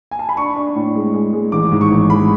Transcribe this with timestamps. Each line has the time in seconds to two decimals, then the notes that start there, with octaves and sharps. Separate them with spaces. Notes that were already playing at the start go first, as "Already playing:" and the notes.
0.11 G#5
0.19 A5
0.29 B5
0.37 D4 C#6
0.56 D4
0.75 A2
0.95 G#3
1.14 G#3
1.33 G#3
1.52 A1 D6
1.72 G#2
1.81 C#6
1.91 A1
2.10 G#3 B5